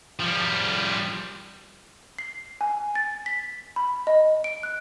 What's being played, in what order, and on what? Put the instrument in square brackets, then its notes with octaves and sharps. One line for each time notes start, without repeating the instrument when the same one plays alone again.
[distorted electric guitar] F3 G3
[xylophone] C7
G#5
A6
B6
B5
D#5
D7
F#6